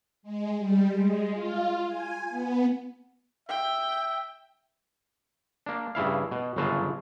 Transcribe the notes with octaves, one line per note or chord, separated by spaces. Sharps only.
G#3
G3
G#3
F4
G#5
B3
E5 G5
A#3 D4
G2 C#3 E4 F5
B2
G1 F#2 C#3 F#3 F4 A5